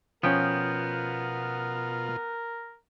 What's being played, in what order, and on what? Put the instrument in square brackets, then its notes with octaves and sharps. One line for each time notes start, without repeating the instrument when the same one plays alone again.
[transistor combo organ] B2 F4 [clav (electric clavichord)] F3 C#4 [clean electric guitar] B3 G5 [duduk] A#4